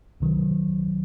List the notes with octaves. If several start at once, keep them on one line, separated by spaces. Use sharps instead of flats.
C2 C3 D#3 F#3